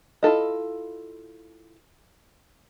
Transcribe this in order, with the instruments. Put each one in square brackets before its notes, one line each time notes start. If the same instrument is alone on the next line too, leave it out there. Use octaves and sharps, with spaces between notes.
[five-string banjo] E4 F4 A4 D#5